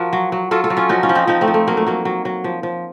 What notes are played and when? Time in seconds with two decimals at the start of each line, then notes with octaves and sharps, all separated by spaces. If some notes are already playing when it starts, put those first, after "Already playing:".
Already playing: F3 F#4 A#4
0.13 F#3
0.32 F#3
0.51 F#3 F4 A4
0.64 F4 A4
0.70 F#3
0.77 C#4 F4
0.89 F3 D#4 F#4
1.03 C#4 F4
1.09 F3
1.15 C4 D#4
1.27 F3 C4 D#4
1.41 A3 C4
1.48 F3
1.54 A3
1.67 F#3 A#3
1.77 A3
1.87 F#3 A#3
2.05 F#3
2.25 F#3
2.44 F3
2.63 F3